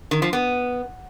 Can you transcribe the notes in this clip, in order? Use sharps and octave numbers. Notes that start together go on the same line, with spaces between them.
D#3
F3
B3